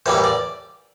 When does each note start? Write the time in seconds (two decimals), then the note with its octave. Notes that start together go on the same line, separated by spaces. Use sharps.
0.06 A2 E3 G3 A#3 C5
0.24 D5